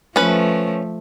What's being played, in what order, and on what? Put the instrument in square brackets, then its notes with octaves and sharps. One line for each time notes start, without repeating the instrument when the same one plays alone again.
[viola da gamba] F3 A3 [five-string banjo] C#4 B4